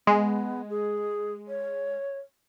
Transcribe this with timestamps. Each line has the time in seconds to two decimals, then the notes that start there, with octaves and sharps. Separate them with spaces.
0.07 G#3 B3
0.70 G#4
1.48 C#5